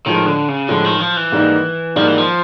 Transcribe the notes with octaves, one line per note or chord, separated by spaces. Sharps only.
A2 D#3 F3 G#3
D3
C#3
A2 D3 F3 G#3
D#3
F3
E3
G#2 D#3 G3 A#3 D#4
G#2 D#3 F3 G3 A#3 D#4
E3
F3